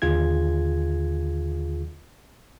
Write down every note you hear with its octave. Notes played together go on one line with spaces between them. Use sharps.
D#2 D3 F4 G#4 G#6